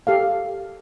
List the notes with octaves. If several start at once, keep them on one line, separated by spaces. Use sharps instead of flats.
G4 A4 F5